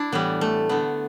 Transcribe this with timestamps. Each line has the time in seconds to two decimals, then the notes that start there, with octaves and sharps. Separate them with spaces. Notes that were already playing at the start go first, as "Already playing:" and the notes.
Already playing: D4 E4
0.12 A2 E3 G3 B3
0.41 A3
0.69 D3 A3 B3